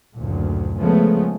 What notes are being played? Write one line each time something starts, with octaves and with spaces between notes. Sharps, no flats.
F#1 D2 A#2
C#3 F3 G#3 A3 B3